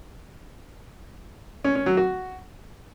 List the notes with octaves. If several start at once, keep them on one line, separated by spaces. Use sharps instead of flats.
C#4
C#4
F#3
F#4